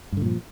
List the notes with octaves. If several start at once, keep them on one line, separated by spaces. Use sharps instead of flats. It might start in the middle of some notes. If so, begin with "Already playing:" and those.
G2 A#2 D3 F3